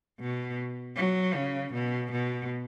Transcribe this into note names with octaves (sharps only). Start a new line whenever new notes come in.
B2
F#3
C#3
B2
B2